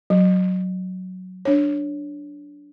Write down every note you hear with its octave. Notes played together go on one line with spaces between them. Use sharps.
F#3
D4 C#5